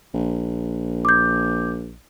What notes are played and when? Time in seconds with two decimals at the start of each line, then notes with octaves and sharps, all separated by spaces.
0.14 A#1
1.05 D6 G6